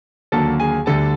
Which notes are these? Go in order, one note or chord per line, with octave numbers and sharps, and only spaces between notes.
D#2 D3 F#3 A#3 A4 A5
G#4 G#5
D2 D3 G3 A4 A5